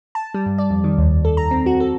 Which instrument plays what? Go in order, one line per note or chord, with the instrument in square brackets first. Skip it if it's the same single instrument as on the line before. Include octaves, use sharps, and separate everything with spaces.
[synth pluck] A5
G3
G2
D5
F2
D#3
D#2
A4
A#5
C4
F#4
A4